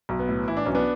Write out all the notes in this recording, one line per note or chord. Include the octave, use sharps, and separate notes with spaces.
B1
B3
A2
E3 E4
D4
B1 C#4
B3 D4